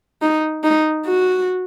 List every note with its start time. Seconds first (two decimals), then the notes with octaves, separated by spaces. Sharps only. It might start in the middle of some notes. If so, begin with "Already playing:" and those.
0.22 D#4
0.64 D#4
1.06 F#4